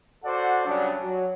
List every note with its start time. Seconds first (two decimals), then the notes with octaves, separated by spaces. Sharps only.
0.25 F#4 A4 C5 D5 F#5
0.66 C#3 F#3 G3 D4
1.02 F#3